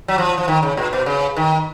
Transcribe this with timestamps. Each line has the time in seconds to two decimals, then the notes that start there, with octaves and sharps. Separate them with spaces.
0.08 F#3
0.18 F3
0.38 F3
0.48 D#3
0.63 C#3
0.77 A#2
0.93 B2
1.06 C#3
1.36 D#3